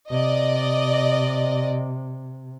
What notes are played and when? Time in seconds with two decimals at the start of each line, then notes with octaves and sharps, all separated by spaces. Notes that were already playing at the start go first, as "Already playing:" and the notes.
0.11 C3 D5 D#5